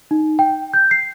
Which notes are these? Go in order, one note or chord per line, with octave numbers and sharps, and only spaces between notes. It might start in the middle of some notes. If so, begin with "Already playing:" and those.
D#4
G5
G6
C7